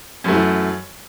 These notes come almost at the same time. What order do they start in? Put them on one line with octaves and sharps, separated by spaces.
F#2 A3 E3